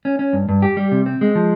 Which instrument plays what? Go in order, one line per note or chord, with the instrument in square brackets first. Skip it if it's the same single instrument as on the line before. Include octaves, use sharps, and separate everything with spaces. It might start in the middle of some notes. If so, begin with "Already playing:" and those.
[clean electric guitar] C#4
C#4
G2
G2
G4
G3
C3
C4
G#3
F3